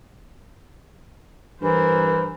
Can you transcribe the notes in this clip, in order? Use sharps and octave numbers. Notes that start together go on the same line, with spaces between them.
G2 E3 A#4 C5